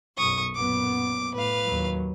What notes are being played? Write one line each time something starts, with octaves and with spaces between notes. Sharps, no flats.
B1 F#2 C#6 D#6
F#2 A#2 B3 D6
A2 B4 F5
D#2 F#3